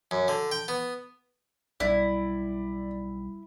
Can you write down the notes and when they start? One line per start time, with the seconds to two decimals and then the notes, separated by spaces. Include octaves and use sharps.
0.11 F#2
0.28 D3
0.51 G5
0.68 B3
1.80 B1 G3 E4 D5